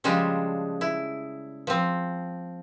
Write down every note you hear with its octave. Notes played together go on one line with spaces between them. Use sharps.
C#3 F3 G3 G#3 D4
E4
F3 C4